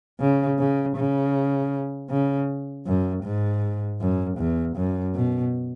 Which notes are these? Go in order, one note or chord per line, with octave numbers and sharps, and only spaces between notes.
C#3
C#3
C#3
C#3
F#2
G#2
F#2
E2
F#2
B2